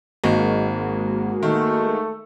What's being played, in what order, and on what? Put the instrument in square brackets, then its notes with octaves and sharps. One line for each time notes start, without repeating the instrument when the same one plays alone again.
[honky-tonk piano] G#1 [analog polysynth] G#3 A#3 F#4
[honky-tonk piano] D#3 [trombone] A3